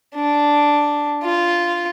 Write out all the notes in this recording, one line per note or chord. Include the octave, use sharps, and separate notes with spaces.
D4
F4